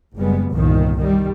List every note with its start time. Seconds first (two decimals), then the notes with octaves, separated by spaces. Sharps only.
0.17 F#1 G3 G#3 B3
0.51 G1 C2 A#2 D#3
0.99 D#3 G3